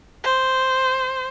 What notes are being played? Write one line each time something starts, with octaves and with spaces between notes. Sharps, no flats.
C5